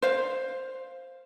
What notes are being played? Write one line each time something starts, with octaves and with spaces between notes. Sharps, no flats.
C5 F5